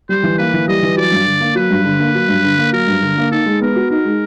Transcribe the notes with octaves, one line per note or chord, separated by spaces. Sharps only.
G3 C5
E3
A#3 B4
E3
G3 D#5
E3
F#3 D5
G2
D3
A#3
F#3 B4
G2
D3
A#3
F#3
G2
D3
A#3
F#3 A#4
G2
D3
A#3
D#4 A4
G#3
B3 A#4
F#4
D#4 A#4
G#3